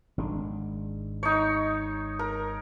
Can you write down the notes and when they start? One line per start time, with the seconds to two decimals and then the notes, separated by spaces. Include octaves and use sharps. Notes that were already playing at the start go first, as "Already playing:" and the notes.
0.18 G#1 G#3 D4
1.23 D#4 C#5
2.19 A#4